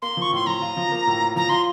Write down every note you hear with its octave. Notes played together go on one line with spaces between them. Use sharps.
A#3 C6
F3 C#6
A2 C6
F3 A#5
F4
F3
A#3
A2
F4
F3 A#5
F4 C6